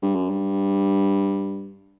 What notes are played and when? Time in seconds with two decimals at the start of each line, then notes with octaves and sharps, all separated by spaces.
0.02 G2
0.15 F#2
0.30 G2